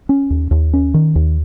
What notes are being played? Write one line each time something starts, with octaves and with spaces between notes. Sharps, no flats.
C#4
D#2
D#2
C#4
D#3
D#2